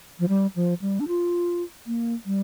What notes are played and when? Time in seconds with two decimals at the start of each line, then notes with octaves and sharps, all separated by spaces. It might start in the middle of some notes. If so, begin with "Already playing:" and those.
0.20 F3
0.28 G3
0.56 F3
0.82 G3
1.00 D4
1.08 F4
1.87 A#3
2.26 G3